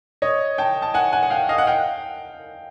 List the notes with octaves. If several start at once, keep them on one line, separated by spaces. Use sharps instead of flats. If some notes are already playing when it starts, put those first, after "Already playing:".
C#5 D#5
G5 A5
A5
F#5 G#5
F#5 G#5
F#5
F5 G5
D#5 F5
F#5
F5 G5